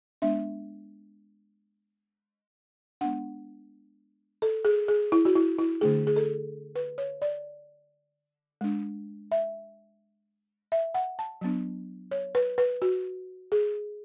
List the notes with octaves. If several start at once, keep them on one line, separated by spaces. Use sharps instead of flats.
G#3 B3 D4 E5
G#3 B3 D4 F#5
A4
G#4
G#4
E4
F#4
E4
E4
D3 A3 D4 G#4
G#4
A4
B4
C#5
D5
G#3 D4
E5
E5
F#5
A5
F#3 B3 D4
C#5
B4
B4
F#4
G#4